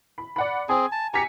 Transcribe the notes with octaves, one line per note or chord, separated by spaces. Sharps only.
B5
D5 F#5 B5
C4 G#4 G#5
A5
G4 G#5 A#5 B6 C#7